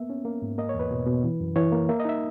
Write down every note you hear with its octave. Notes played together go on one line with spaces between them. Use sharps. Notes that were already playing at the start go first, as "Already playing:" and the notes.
Already playing: A#3 B3 E5
C#4
A#3
G#2
A#3 D#5
C#5
E2 B4
B2
B2
E3
F#2
E3 C#5
A#3
A#3 E5
D#5
D#4 E5